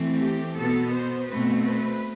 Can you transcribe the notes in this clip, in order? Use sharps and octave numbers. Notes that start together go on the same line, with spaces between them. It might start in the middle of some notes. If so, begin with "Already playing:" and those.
Already playing: E3 A3 C4
G4
B2 B3 A4
C5
B2 A3 C4 B4
B4